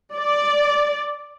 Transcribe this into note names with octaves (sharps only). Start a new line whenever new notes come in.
D5